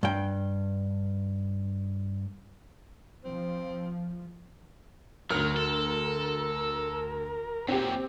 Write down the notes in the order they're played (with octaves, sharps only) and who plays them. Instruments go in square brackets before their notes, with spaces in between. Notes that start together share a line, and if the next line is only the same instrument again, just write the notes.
[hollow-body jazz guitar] G2 G5
[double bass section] F3 [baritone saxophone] C4
[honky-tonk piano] D2 F6 [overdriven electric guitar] F#3 [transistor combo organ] A#4
[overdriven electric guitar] A4
[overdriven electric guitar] F#2 A#2 [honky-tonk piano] C4 G4